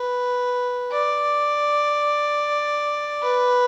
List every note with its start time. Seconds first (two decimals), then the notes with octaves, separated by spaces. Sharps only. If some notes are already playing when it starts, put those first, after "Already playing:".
Already playing: B4
0.92 D5
3.22 B4